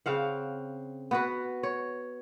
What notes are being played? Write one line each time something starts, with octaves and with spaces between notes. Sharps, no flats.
C#3 C4 F5 F#5
B3 F#4 B4
C#5